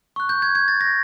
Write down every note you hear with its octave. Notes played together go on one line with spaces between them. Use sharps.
C#6 F#6
G6
G#6
G#6
A6
A#6